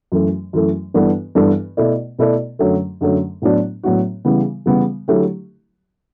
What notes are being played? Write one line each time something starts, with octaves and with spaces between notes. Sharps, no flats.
F#2 E3 A3
F#2 E3 A3
G2 E3 B3 D4 A4
G2 E3 B3 D4 A4
B2 A3 E4 A4 D5
B2 A3 E4 A4 D5
F#2 D3 F#3 A3
F#2 D3 F#3 A3
A2 F#3 B3 D4 F#4
A2 F#3 B3 D4 F#4
C#3 E3 G3 B3
C#3 E3 G3 B3
D3 F#3 A3 E4 G4